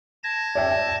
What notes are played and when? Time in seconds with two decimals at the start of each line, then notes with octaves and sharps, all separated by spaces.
0.24 A5 G#6 A#6
0.55 D5 E5 G5